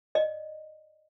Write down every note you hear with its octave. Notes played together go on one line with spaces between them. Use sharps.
D5 D#5